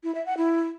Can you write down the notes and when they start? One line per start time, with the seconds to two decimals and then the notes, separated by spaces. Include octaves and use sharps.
0.04 E4
0.15 E5
0.26 F#5
0.37 E4